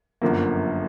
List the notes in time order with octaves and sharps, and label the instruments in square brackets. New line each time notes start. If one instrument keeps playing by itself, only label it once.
[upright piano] G1 F#2 D3 F3 A#3